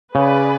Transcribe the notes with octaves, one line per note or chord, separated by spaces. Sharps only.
C#3 C#4 G#4 B4 D5